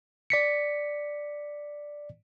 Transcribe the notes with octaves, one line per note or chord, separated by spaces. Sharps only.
D5 B6 C#7